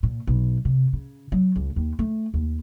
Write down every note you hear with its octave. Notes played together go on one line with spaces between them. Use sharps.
A#2
B1
C3
C#3
F#3
C#2
D#2
A3
D#2